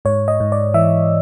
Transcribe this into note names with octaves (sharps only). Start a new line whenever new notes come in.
G#2 C#5
D#5
G#2
D5
E3 E5